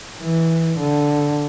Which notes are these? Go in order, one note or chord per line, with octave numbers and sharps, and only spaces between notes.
E3
D3